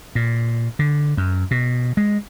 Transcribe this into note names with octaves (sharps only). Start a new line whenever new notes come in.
A#2
D3
F#2
B2
G#3